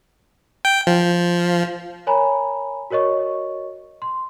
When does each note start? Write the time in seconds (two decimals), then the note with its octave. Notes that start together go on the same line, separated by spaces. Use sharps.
0.65 G5
0.87 F3
2.07 A#4 C#5 G#5 A#5 B5
2.90 F#4 A#4 C#5 D#5 C#6
4.02 C6